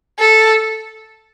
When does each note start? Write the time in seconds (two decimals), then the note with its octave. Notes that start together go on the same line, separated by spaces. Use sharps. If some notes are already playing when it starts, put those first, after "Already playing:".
0.19 A4